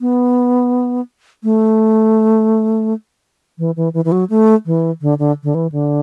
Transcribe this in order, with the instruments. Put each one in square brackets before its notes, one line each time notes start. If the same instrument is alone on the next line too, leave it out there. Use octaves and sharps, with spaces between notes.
[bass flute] B3
A3
E3
E3
E3
E3
F#3
A3
E3
D3
D3
D3
E3
D3